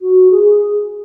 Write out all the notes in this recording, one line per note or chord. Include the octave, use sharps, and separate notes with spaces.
F#4
G#4